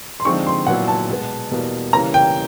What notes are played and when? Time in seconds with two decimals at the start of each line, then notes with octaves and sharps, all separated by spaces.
0.20 C6
0.25 D3 F3 G#3 C4 D#4 C#6
0.47 C6
0.67 A#2 F#3 B3 E4 F#5
0.88 A5
1.09 B2 G#3 B3
1.51 E2 B2 G3 A#3
1.93 C#3 E3 G3 A#3 C#4 A#5
2.14 G5